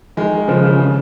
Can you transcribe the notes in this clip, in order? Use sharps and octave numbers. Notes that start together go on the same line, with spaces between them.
D#3 G#3
C#3 F3
C#3
C#3